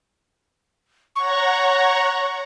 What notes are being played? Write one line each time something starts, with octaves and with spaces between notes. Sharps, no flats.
C#5 F#5 A#5 C#6